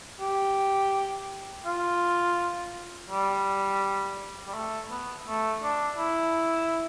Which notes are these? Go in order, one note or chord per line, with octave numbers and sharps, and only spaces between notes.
G4
F4
G3
G3
A3
B3
A3
D4
E4